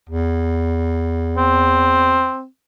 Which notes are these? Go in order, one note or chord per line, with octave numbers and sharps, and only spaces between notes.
E2
C4